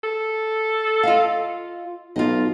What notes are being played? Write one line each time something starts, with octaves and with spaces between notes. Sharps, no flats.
A4
F4 D#5 F5
B1 F4 D#5